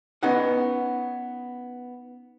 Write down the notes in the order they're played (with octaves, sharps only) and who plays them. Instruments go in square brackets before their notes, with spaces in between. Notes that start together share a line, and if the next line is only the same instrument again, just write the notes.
[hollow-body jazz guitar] B3 C#4 D#4 F#5